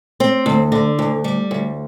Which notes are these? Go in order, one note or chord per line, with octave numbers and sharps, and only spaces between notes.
C4
D2
D3
D2
G3
D2